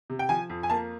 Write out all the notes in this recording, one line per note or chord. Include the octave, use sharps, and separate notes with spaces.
C3
G5
F3 G#5
F2
G#5
A#3 A5